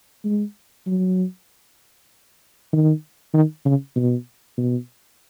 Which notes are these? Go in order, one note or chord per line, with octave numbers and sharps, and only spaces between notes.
G#3
F#3
D#3
D#3
C#3
B2
B2